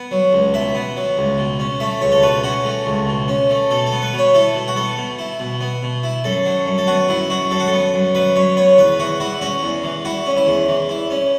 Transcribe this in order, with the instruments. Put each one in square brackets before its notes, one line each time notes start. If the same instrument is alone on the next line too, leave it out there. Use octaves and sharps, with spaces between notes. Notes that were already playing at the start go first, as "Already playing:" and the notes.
Already playing: [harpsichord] B3
F#3
C#2
B2 E5
B3
F#3
C#2
B2
C#4
A3 E5
C#2 C#5
A4
B2 B4
C#4 F#4
A3
C#2
B2
C#4
A3
B2 A4
A4
B3
B4
B2
C#5
E4 A4
B2
F#4
B3 A4
B2
E4
B2
B3
B2
E4
F#2 A4
F#3
F#2
A4
B3 F#4
F#2 E4
F#3 F#4
F#2 A4
F#4
A4
B3
F#2
F#3 B4
F#2 C#5
B3 C#5
E2 B4
E3 F#4
E4 F#4
C#4 F#4
E2
E3
E4 F#4
C#4
E4
E2
E3
E4
C#4